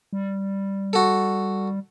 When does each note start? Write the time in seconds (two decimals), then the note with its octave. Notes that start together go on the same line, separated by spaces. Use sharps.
0.13 G3
0.93 F#4 A4